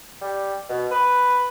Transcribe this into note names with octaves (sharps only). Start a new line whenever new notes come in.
G3
B2
B4